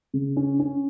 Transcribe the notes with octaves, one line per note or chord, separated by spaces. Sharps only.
C#3
C#4
C#4